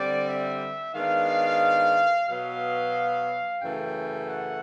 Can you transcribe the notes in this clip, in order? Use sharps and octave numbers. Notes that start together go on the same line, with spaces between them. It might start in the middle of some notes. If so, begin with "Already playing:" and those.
Already playing: D3 G3 C4 D5
E5
D#3 G#3 B3 D4 F5
B2 F#3 B3 F5
F#2 C#3 E3 A3 G5
F#5